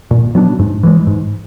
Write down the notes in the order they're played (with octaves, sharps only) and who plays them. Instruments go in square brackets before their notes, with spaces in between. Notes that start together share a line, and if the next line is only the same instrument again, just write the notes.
[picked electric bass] A#2
F#3 B3 D4
G#2
E3 G#3
G#2